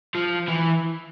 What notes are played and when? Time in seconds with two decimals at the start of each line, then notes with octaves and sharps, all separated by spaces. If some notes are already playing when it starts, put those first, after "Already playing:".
0.15 F3
0.48 E3